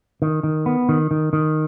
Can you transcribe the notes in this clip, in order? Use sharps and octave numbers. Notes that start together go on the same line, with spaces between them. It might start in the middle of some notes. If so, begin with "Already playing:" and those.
D#3
D#3
B3
D#3
D#3
D#3